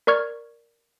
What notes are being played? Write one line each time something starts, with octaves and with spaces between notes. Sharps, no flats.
A#4 D5 C#6 F6 G#6